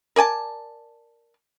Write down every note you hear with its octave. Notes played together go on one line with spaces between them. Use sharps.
A#4 D5 G#5 A5